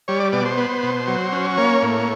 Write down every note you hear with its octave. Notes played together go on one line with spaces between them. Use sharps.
G3 C#5
D5
B2 D5
C5
B3
B2
F#3
C#4
A#3 C#5
A2